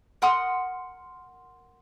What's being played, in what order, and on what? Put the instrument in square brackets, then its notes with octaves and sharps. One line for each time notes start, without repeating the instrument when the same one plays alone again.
[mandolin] A#4 F#5 C6 D#6